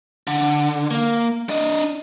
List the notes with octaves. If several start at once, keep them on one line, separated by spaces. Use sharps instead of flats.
D3
A#3
D4 D#5